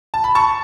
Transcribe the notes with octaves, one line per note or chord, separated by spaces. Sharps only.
A5
B5
A5 C#6